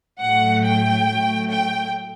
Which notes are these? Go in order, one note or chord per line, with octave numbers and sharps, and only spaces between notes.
A2 F#3 A3 F#5
G5
A2 F#3 A3
G5